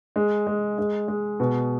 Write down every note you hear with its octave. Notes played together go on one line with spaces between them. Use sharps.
G#3
G#3
G#3
G#3
B2